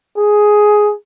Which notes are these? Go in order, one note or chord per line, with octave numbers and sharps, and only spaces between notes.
G#4